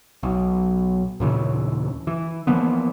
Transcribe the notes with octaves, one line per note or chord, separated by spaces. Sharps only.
B1
D#2 A#2 C#3 E3
E3
E3 F3 A#3 B3